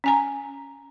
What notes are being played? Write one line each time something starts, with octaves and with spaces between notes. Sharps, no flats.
C#4 G#5 A#5